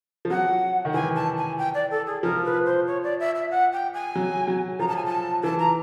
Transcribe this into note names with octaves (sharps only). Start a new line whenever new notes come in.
F3
F#3 F#5
D#3
E3 G#5
A5
G#5
G5
D5
A4
G#4
F3 A#4
B4
C5
C#5
D5
E5
E5
F#5
G5
G#5
F#3
F#3
F3 A#5
A5
G#5
A5
E3 A5
A#5